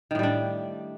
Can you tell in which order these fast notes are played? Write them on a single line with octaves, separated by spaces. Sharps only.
D#3 A2 G3 D4